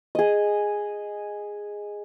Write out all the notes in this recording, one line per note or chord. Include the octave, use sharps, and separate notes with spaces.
G#4 D#5